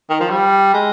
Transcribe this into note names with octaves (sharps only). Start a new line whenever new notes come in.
D#3
F3
G3
G#3